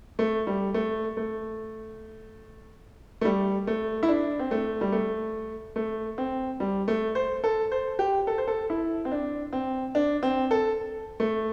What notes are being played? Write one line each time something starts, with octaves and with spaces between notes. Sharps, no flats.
A3
G3
A3
A3
A3
G3
A3
E4
D4
C4
A3
G3
A3
A3
C4
G3
A3
C5
A4
C5
G4
A4
C5
A4
E4
C4
D4
C4
D4
C4
A4
A3